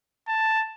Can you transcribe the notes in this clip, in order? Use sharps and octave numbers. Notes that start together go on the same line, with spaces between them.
A5